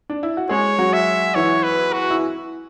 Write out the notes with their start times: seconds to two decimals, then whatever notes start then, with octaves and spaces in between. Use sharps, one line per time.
0.10 D4
0.23 E4
0.37 F#4
0.49 G#3 G#4 C#5
0.79 F#3 F#4
0.93 E5
1.35 E3 E4 C#5
1.63 B4
1.93 F#4
2.10 E4